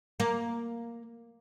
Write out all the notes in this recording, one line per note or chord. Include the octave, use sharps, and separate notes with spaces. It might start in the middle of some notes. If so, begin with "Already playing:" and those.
A#3